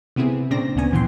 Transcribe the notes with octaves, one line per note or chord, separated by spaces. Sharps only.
C3 B3 C4 E4 G#4
A#2 C#3 C4 D4 D5 A#6
D2 C#3 B3 G#5
F#2 A#2 E3 B3 G5 C6